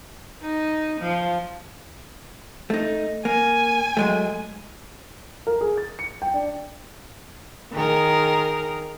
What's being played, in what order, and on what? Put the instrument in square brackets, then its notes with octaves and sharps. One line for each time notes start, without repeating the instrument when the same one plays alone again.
[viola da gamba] D#4
F3
[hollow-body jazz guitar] A3 D#4
[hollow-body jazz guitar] A#3 [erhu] G#5
[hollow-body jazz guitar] F#3 G#3 A3
[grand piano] A#4
G#4
A6
C#7
G5
D4
[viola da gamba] D#3 G#4 A#4